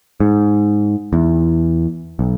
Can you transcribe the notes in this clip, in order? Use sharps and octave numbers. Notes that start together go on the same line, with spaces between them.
G#2
E2
B1